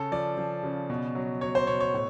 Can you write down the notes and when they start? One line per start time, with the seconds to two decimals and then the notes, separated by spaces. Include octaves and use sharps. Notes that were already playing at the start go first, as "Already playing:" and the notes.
Already playing: C#3 A4
0.12 F3 D5
0.38 F3
0.63 C#3
0.90 B2
1.15 F#3
1.41 F#3 C#5
1.55 C5
1.67 B2 C#5
1.80 C#5
1.94 A2